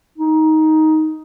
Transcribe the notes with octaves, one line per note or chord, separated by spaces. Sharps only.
D#4